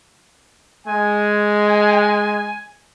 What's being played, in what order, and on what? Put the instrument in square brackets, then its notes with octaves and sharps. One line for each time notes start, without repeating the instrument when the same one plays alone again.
[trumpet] G#3 [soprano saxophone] G#5